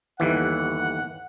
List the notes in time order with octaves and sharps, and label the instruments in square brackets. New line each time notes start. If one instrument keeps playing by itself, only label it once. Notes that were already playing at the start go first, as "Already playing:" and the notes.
[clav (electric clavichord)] G1 D#2 E3 [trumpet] F#5